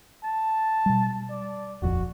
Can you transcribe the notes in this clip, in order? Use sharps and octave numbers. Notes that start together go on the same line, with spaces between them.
A5
B2 G3
D5
D#1 A#1 F2 F#4